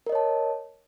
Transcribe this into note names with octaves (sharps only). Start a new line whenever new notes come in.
A#4 C#5 D#5 A5